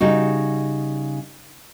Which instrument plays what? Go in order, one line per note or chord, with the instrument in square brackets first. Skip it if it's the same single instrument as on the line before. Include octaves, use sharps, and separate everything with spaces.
[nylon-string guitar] C#3 G3 D#4 F#4